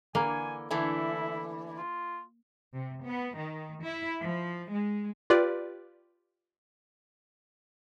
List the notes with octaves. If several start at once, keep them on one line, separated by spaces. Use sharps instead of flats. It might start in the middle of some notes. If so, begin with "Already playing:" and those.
D3 E3 A#3 G#5
D3 E3 A3 E4
F4
C3
B3
D#3
E4
F3
G#3
F4 G4 B4 D5